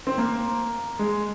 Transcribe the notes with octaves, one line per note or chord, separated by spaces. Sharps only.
C4
A#3
G#3